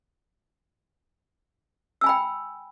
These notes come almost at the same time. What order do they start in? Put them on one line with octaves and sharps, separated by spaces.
E6 G#5 B5 G5